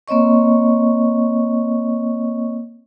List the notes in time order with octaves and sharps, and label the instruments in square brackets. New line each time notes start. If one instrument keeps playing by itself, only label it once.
[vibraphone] A#3 C4 C#5 D#5 C#6